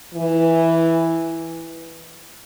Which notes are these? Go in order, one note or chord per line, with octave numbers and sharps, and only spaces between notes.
E3